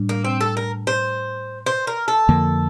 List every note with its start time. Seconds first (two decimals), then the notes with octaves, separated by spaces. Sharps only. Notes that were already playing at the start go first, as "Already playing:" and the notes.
Already playing: A2 G3 D4
0.09 A#3
0.24 C4
0.41 A4
0.57 A#4
0.87 C5
1.66 C5
1.87 A#4
2.08 A4
2.29 F2 D3 F3 A#3